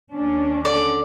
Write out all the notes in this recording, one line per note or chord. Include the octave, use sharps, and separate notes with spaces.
D#2 C#4 D4
D3 D5